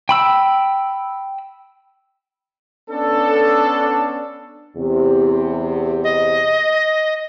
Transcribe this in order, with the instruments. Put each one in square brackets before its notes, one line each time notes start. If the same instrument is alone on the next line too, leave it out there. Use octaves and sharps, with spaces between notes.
[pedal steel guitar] G5 B5 E6
[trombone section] B3 C#4 D4 [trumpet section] A4
[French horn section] E2 C3
[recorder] D#5